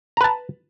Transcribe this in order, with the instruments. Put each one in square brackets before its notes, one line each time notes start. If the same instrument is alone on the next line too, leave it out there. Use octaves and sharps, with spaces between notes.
[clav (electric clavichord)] A#5
B4
A5